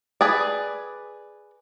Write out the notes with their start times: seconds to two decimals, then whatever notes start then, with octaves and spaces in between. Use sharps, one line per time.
0.21 G#4 B4 D5